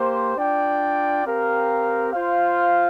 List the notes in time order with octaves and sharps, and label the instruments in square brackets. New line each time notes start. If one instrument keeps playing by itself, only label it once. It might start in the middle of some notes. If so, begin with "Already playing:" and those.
Already playing: [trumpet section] A#3 G4 C5
D4 F4 D5 G5
C4 G4 A#4 F5
F4 C5 F5